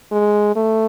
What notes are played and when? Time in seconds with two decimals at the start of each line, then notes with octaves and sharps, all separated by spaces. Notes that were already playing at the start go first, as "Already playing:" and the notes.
0.12 G#3
0.56 A3